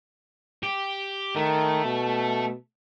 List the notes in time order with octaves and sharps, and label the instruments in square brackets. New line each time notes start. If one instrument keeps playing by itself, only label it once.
[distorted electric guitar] G4
[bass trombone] D#3 [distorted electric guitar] A3
[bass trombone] B2